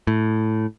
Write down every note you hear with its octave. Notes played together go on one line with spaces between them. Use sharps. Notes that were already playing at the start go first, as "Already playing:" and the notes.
A2